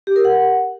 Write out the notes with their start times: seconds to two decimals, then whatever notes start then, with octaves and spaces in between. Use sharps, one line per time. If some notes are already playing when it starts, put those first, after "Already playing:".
0.07 G4
0.16 A#4
0.25 F#5